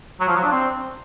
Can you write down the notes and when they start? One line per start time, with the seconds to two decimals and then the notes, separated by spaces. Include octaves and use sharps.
0.20 F#3
0.28 F3
0.36 F#3
0.44 D4
0.51 C4